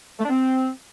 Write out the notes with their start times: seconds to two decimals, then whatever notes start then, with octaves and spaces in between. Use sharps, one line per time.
0.19 A3
0.24 D4
0.30 C4